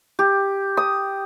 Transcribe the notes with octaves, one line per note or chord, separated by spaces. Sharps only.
G4
D#6